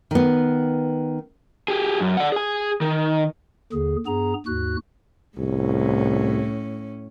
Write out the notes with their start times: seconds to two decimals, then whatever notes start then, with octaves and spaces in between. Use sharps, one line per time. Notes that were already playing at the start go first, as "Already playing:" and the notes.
0.11 D#3 B3
1.68 G4 G#4
2.00 F#2
2.17 D5 F#5
2.32 G#4 G#5
2.81 D#3
3.73 D#2 D3 G#4
4.06 G2 B3 G#4 A#5
4.46 D#2 G#2 F#4 F#6
5.38 C2 A2 C#4